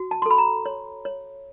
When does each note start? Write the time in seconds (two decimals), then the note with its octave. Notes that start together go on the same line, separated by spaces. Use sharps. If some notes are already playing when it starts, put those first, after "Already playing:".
Already playing: F#4
0.11 A5
0.22 C6
0.26 A4 B5
0.38 A#5
0.66 C#5
1.05 C#5